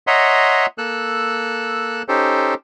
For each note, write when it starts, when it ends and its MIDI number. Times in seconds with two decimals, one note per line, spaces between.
0.07 0.66 73
0.07 0.66 75
0.07 0.66 76
0.07 0.66 78
0.07 0.66 82
0.07 0.66 84
0.78 2.02 58
0.78 2.02 69
0.78 2.02 88
0.78 2.02 90
2.08 2.54 61
2.08 2.54 63
2.08 2.54 67
2.08 2.54 69
2.08 2.54 72